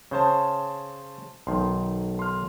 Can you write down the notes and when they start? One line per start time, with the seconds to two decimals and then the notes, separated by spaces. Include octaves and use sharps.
0.11 C#3 C#4 C5 A5
1.47 B1 D#3 C6
2.19 C6 F6